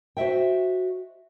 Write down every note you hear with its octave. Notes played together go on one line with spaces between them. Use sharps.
F#4 C5 D#5 E5 G5